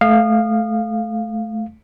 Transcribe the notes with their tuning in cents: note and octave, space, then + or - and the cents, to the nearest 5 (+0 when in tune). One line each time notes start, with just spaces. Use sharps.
A3 -20 F5 +0 D#6 -30